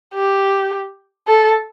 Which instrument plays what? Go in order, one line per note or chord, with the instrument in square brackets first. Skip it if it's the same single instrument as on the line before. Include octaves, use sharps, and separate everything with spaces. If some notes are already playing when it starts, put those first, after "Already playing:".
[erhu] G4
A4